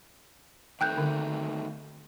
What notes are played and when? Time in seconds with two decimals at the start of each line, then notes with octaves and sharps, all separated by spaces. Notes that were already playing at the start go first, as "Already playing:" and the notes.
0.81 D#3 A3 C4 G5 F#6 G6
0.98 D3